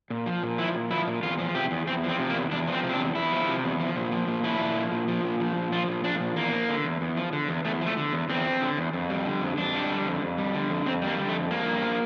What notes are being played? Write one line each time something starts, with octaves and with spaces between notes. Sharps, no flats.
A#2
F3
A#2
F3 E4
A#2
F3 E4
A#2
E2 F4
F3
C3 G4
E2
E2 C4
F3
C4
C3
A#3
E2
E2 D4
F3 C4
C3
C4
D4
E2
E2 E4
F3
C3
E2
F3
A#2
F3
A#2
F3 E4
A#2
F3
A#2
F3
A#2
F3
A#2
F3 F4
A#2
F3 D4
A#2
E2 A#3
F3
D3
E2
E2
F3
D3
E2
E2 A3
F3 A3
D3
E2
E2 C4
F3
D3
E2
F2
G3
D3
F2
F2 D4
G3
D3
F2
F2
G3
D3
F2
F2 C4
G3
A#3
D3
A3
F2
F3 A#3
G2
F3